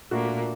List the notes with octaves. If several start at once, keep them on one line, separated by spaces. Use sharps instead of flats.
A#2 A3 A#3 D4 F#4